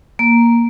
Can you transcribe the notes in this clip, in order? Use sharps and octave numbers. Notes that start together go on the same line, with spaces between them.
A#3